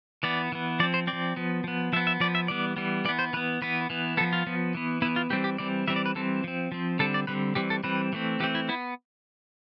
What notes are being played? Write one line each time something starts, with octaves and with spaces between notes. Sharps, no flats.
E3 B3 D5
E3 B3
F3 C4 D5
C5
C4 D5
F3
F3 B3
F3 B3
F3 B3 E5
E5
F3 B3 D5
E5
E3 G3 B3 D5
E3 G3 B3
E3 B3 D5
C5
E3 B3 B4
E3 B3 B4
E3 B3
F3 B3 A4
F4
F3 B3
E3 B3
E3 B3 E4
F4
E3 G3 C4 G4
G4
E3 G3 C4 D5
E3 G3 C4 E5
D5
B4
E3 G3 C4 A4
F3 C4
F3 C4
D3 G3 C4 A4
D5
D3 G3 C4 B4
E3 G3 C4 G4
A4
E3 G3 C4 B4
E3 A3 C4
E3 A3 C4 G4
E4
B3 E4